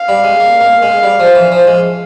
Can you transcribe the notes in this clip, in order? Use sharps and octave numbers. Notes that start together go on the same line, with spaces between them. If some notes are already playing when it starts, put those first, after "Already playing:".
Already playing: F5
G3
G#3
A#3
A#3
G#3
G3
F3
E3
F3
G#3